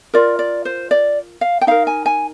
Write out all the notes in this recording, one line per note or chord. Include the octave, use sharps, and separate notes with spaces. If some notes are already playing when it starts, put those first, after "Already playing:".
F4 A#4 D5
D5
C5
D5
F5
G5
D#4 A#4 F5
G#5
G#5